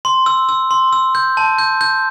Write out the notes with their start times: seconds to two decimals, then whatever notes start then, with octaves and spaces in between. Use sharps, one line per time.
0.05 C6
0.26 E6
0.49 E6
0.71 C6
0.93 E6
1.15 G6
1.37 A5
1.59 G6
1.81 G6